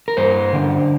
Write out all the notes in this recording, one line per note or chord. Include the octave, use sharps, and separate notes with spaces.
A#4
G2 C5
D3